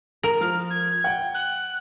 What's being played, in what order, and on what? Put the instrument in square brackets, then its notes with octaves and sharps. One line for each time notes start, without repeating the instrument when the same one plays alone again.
[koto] A#4 [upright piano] F7
[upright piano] F3 [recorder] F6
[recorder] G#6
[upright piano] F#5 G5
[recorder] F#6